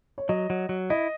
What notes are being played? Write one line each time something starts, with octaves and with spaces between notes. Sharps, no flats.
C#5
F#3 D#5
F#3
F#3
E4 D#5